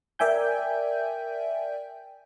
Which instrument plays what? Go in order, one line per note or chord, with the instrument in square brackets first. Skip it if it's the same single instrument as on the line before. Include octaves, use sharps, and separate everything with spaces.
[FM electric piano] A#4 D5 E5 G5 G#5 G6